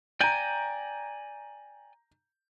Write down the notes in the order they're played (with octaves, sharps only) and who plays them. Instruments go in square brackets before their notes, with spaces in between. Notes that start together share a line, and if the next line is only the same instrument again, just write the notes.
[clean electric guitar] D5 G5 G#5 [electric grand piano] A#5 G6